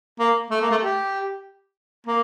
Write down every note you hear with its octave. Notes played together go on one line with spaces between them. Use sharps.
A#3
A3
A#3
A3
G4
A#3